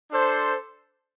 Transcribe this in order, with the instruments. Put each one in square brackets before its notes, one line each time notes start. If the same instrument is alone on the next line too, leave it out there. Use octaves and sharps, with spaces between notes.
[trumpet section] D4 A4 C5